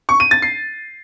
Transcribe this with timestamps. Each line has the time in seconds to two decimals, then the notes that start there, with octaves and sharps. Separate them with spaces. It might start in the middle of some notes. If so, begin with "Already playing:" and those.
0.09 C#6
0.20 D#7
0.31 A6
0.42 C7